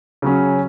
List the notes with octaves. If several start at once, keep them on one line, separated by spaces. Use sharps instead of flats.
C#3 F#3 C#4